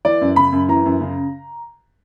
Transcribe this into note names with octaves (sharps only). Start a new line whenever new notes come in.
E3 D5
F#2
C#3 B5
F#2
E3 A#5
F#2
C#3